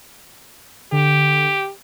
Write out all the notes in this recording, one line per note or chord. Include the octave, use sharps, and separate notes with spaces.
D3 G4